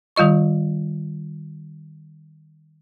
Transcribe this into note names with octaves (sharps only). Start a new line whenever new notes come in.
D#3 G3 F4 D#5 C#6